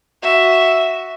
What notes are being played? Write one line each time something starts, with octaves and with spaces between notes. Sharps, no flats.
F#4 E5